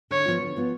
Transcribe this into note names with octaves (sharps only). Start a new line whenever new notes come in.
D3 C#5
F3 B3 F4
D3
F3 B3 F4